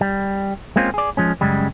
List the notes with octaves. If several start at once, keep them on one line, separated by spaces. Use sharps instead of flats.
G3
G#3 A#3 C4 C#4 F4
G#4 D5
F3 G#3 C#4
F#2 C#3 G3 G#3